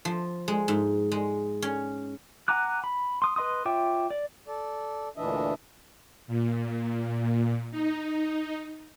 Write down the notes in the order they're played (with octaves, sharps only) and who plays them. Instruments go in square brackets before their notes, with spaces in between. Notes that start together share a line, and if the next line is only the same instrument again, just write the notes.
[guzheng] F3
G#3
G#2
G#3
C#4
[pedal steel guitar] F#5 G#5 A#5 D6 F#6
B5
C6 D#6
B4 D#5 C6 D#6
F4 C#5 E5 G5 D6
D5
[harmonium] A4 D5
D2 A#2 E3 D4 D#5 E5
[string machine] A#2
D#4